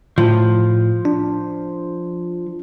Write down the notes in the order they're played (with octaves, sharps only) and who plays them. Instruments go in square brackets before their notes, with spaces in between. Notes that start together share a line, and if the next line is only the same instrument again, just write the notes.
[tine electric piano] A2 [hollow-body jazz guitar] F3
[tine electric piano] D4